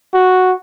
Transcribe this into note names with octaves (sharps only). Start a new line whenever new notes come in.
F#4